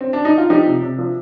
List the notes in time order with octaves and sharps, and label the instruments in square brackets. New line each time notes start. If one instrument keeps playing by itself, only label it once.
[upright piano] C4
D4
D#4
F4
F3 D#4 G4
C3
C3
F3